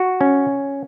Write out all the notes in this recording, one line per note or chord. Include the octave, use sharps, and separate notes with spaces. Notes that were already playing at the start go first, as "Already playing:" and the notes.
Already playing: F#4
C#4